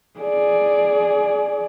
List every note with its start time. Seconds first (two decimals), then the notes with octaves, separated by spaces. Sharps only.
0.20 G#4 D5